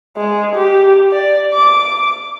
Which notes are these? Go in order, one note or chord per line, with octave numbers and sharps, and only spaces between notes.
G#3
G4
D5
D6